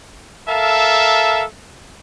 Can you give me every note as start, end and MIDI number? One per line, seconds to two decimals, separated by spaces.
0.48 1.44 69
0.48 1.44 70
0.48 1.44 76
0.48 1.44 77
0.48 1.44 81